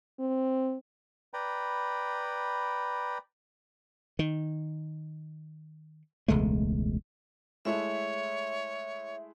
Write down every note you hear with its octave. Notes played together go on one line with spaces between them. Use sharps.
C4
B4 D5 G5 A#5 B5
D#3
E1 C#2 G#3 A3
G#3 A3 E4 C#5 E5